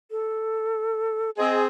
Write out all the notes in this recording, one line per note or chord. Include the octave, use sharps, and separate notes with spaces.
A4
C4 G#4 D#5